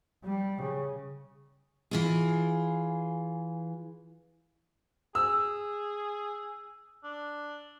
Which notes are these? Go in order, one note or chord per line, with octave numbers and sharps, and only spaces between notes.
G3
C#3
E3 F4 G#4
G#4 E6
D4